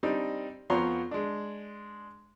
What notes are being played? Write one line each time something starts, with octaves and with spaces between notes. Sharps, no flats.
G3 C4 D4 D#4
F2 F3 B3 C#5 A#5 C6
G#3 D4